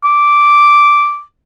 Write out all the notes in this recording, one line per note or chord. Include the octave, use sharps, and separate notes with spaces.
D6